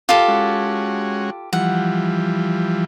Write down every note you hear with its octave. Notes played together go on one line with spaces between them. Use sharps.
F4 G4 A4 A#4
G#3 C#4 F#4
E3 F3 G3 F#5